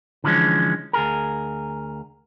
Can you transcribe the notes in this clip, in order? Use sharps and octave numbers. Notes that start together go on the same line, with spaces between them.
D3 E3 F3 G#3 C#4
D2 G#4 A#4